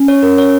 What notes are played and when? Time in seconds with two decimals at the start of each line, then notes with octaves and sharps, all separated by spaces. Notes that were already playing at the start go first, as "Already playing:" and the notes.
Already playing: C#4
0.08 C#5
0.23 A#4
0.38 C#5